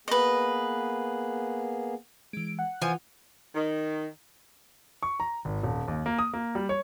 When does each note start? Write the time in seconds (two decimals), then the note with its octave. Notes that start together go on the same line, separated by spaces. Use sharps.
0.08 A#3 B3 G#4 B4 D#5
2.33 E3 G#3 D7
2.59 F#5
2.82 E3 F3 F4 B4 G#5
3.55 D#3
5.03 C#6
5.20 A#5
5.45 G#1
5.63 D#1
5.88 D#2
6.06 A#3
6.19 D#6
6.33 A#3
6.55 G3
6.69 C#5